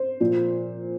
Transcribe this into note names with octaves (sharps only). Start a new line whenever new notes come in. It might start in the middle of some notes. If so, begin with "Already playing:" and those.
Already playing: C5
A#2 F3